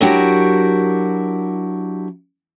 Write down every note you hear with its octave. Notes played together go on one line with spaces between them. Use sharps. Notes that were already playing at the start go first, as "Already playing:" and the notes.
F#3 D4 E4 F#4 G4 A#4